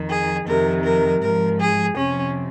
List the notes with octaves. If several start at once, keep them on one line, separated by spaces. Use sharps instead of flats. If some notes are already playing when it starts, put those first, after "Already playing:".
Already playing: F2 D#3
G#4
F2 C3 D#3 A#4
A#4
G#2 F3 A#4
G#4
F2 C3 F3 C#4